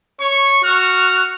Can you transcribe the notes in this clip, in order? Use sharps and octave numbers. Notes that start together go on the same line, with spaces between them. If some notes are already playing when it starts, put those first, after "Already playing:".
C#5 C#6
F#4 F6